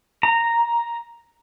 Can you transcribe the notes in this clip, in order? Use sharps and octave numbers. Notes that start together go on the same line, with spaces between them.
A#5